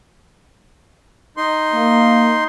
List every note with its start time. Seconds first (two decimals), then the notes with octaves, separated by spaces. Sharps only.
1.37 D#4 C6
1.73 A#3